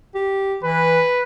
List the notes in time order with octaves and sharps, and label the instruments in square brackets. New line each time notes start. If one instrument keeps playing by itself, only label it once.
[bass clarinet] G4
[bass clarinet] E3 [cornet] B4